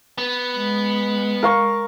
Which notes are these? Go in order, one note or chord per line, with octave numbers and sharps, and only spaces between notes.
B3
G#3
A#4 F5 C#6